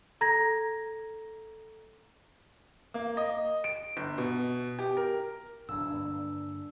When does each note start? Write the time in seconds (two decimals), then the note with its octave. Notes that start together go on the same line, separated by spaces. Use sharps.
0.21 A4 A#5 G#6 A#6
2.94 A#3
3.17 D#5
3.64 D7
3.97 G1
4.18 B2
4.79 G4
4.97 A#4
5.69 D1 B1 G2 D4 E6
5.94 G2 D3 A#3